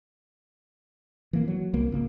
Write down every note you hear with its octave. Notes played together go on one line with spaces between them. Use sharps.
E3 A#3
F#3
C2 A#3
G#1 C#2 A#3